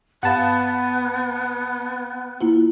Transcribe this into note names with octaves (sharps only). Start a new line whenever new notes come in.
G2 B3 G4 F5 F#5 A5
A#3 E4 F4